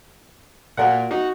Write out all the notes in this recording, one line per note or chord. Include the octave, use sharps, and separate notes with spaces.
A#2 F#4 A#4 F#5
D#4 F#4